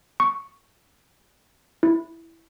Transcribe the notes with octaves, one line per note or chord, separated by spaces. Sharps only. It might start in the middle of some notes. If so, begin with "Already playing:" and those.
C#6
E4